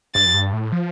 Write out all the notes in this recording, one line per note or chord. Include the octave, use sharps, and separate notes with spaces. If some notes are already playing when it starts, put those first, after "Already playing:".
G2 A6
F2
G2
A2
F3